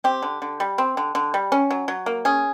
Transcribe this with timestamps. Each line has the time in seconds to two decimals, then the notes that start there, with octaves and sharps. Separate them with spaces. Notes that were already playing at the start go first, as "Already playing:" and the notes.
0.04 C4 G4
0.22 D3
0.42 D3
0.60 G3
0.78 C4
0.97 D3
1.15 D3
1.34 G3
1.52 C#4
1.71 F#3
1.88 F#3
2.06 A#3
2.25 C#4 G#4